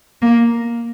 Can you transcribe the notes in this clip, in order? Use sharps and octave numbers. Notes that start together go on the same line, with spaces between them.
A#3